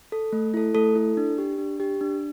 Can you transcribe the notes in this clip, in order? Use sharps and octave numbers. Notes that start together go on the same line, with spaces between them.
A4
A3
E4 A4
A3 A4
E4 A4
D4
G4
D4
G4
D4